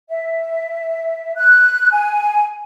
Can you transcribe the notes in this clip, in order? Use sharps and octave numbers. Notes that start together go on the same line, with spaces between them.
E5
F#6
G#5